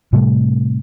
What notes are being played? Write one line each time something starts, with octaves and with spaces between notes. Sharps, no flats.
A2 C3 G3 A3